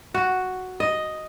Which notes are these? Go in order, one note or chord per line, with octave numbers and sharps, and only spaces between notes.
F#4
D#5